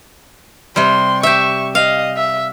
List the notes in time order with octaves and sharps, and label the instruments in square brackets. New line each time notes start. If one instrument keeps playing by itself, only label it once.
[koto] C3 G3 [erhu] C6
[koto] G4 E5 [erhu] C#6
[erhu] D#5 [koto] F5
[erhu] E5